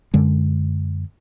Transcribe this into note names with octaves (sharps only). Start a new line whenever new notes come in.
F#2 D3 G#3